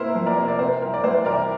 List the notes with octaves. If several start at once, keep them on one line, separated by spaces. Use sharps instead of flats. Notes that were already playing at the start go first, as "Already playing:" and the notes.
Already playing: C3 A#3 E4 A#4 C5
F3
A#4 D5
C3
D5
C3 C5
C2 A#4
D5
E3 C5
C2 A#4 D5